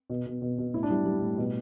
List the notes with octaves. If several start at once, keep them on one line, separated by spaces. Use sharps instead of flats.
B2
B2
B2
B2
A2 E4
D4
G3 E4
G3
A2
B2